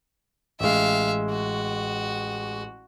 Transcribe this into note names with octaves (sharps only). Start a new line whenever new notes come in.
A1 G#3 E5 F5
F#4